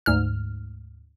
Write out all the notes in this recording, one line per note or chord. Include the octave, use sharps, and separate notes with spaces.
D2 G#2 F6